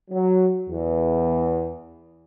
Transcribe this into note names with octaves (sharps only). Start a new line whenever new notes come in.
F#3
E2